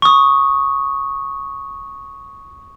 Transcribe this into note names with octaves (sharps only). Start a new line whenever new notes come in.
C#6 D#6